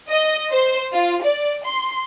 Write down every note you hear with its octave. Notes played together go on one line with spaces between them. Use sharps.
D#5
C5
F4
D5
C6